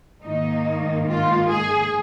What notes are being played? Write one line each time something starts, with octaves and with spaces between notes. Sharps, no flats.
G#2 D#3 A#3 D#4
F4
G#4